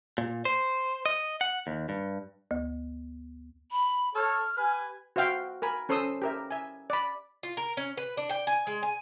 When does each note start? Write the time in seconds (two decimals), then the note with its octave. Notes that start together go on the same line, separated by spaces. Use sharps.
0.18 A#2
0.45 C5
1.06 D#5
1.41 F#5
1.67 D#2
1.89 G2
2.51 D2
3.71 B5
4.15 A4 C#5 F6
4.58 G4 B4 G#5
5.16 F#4 C5 E5 F5 G5
5.62 A#4 G#5 B5
5.89 C#4 A4 C5 C6 D#6 E6
6.22 G4 A#4 E5
6.51 E5 G#5
6.90 D5 B5
7.43 F4
7.57 A#4
7.77 C#4
7.97 B4
8.17 D4
8.30 G5
8.47 G#5
8.67 G#3
8.83 G#5